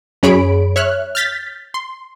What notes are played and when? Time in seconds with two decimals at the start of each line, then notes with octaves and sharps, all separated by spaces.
0.23 F#2 G#4 C#5 B5 D7
0.76 C#5 E5 F6 F#6
1.15 F6 G6 A6 B6
1.74 C6